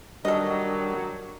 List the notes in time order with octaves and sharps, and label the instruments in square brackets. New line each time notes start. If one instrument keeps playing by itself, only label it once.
[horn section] D#3 F#3 [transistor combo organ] G3 D4 [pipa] A4 D#5